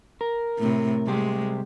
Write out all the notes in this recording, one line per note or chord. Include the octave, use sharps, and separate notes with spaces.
A#4
A2 C3
C3 G3 G#3 G4